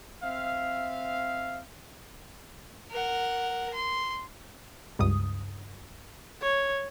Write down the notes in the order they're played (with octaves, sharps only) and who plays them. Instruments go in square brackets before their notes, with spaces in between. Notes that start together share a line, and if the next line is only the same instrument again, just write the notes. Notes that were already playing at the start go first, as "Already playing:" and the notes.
[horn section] C4 E5 F5
[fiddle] A#4 F#5
C6
[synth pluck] C#2 G2 D#6
[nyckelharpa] C#5